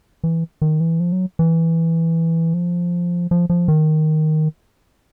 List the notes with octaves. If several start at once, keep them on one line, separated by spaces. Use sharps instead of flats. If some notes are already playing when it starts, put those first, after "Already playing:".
E3
D#3
E3
F3
F#3
E3
F3
F3
F3
D#3